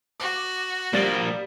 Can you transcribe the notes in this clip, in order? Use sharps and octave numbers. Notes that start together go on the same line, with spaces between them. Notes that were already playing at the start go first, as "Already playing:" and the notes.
F#4 D6
F3 G3 A#3 A6 F#7